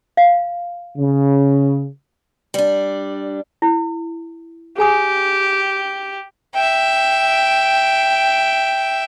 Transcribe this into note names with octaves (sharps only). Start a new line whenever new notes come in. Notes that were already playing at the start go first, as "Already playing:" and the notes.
F5
C#3
G3 D4
E4
G4 G#4 G#5 D#6
E5 G5